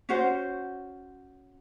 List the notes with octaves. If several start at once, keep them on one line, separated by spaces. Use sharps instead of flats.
C#4 F#4 C5